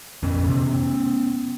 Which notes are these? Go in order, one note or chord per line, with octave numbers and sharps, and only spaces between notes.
F2 B3 C#4
C3